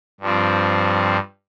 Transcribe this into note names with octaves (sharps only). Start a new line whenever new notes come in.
G2 F3 C4